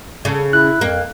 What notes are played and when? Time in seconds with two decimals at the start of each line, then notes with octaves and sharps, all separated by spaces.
0.25 C#3 A4
0.53 E4 F#6
0.81 F2 A#3